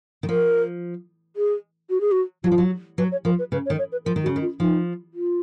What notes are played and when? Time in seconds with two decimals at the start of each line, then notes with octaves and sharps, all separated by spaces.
0.23 D#3
0.29 F3 A#4
1.36 G#4
1.90 F#4
2.01 G#4
2.12 F#4
2.44 F#3 F4
2.52 F3
2.58 F#3
2.98 F#3 B4
3.12 C#5
3.25 F3 A#4
3.39 B4
3.52 C#3 B4
3.66 C#5
3.70 D#3
3.79 C#5
3.92 B4
4.05 F3 A#4
4.16 D#3
4.23 F#4
4.26 C#3
4.36 D#3
4.42 F4
4.60 F3 D#4
5.14 F4